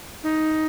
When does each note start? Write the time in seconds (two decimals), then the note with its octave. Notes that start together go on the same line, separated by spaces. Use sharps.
0.23 D#4